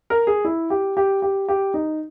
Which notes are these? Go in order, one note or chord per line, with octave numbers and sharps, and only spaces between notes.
A#4
G#4
E4
G4
G4
G4
G4
D#4